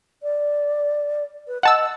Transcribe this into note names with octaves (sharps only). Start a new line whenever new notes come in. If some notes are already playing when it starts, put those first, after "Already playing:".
D5
B4
D#5 F#5 A5 E6